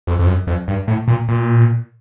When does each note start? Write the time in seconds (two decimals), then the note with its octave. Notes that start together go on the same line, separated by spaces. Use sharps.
0.07 F2
0.19 F2
0.27 F#2
0.47 F2
0.68 G2
0.88 A2
1.08 A#2
1.28 A#2